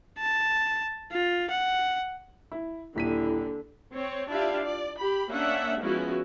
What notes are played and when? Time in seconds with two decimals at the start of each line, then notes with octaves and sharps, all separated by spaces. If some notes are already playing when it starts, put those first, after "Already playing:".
0.19 A5
1.11 F4
1.50 F#5
2.52 E4
2.96 D#1 D3 E4 B6 D#7
3.94 C4 C#5
4.29 D4 E4 F4 G4 E5 F5
4.64 D5
4.99 G4 B5
5.30 A#3 C#4 D4 E5 F#5
5.81 F3 G#3 B3 C#4 E4 F#4